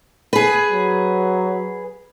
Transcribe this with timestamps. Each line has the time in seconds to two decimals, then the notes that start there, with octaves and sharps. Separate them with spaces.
0.33 G#4 B4
0.71 F#3